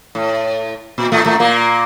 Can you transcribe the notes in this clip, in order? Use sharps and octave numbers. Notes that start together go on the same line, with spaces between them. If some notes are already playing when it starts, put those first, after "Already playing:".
A2
A#2
A2 A3
A2 A3
A#2 A#3